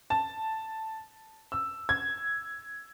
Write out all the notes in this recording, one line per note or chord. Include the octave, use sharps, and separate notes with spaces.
A5
E6
G#6